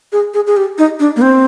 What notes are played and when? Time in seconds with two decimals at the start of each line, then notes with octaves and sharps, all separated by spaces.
0.12 G#4
0.34 G#4
0.47 G#4
0.57 G4
0.78 D#4
1.00 D4
1.16 A#3
1.22 C4